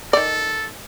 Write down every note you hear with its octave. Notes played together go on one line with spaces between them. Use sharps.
D#3 A4 D5